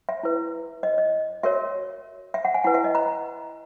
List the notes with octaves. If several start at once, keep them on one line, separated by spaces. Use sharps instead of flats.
E5
E4 B4
D#5
D#5
F#4 A#4 C#5 E5
E5
F#5
G#5
E4 B4 F#5
E5
D#5
A#5